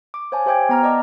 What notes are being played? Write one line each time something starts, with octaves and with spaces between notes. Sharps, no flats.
D6
C5 C#5 F5 G#5 A5
G4 C5 E5 G5 D6 G#6
B3 A#5 F6
D5 D#5 A5 D6